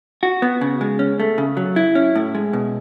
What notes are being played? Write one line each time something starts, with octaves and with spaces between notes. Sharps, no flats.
F#4
B3
C#3
G#3
C#4
A3
C#3
F#3
E4
C#4
A2
G#3
B2